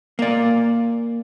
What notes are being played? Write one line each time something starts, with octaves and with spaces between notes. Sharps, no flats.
A#3 D5